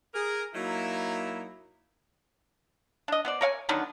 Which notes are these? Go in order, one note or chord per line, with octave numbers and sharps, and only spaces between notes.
G#4 A#4
F#3 A#3 D#4 E4
D4 D#5
B3 C5 D5
A#4 C#5 F5 G#5
D3 D#3 F#3 B3